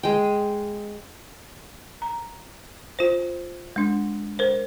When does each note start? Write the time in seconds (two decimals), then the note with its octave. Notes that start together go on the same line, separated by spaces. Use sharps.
0.03 G#3 G5
2.02 A#5
2.99 F4 C5
3.76 G#3 D4
4.39 A#4 C5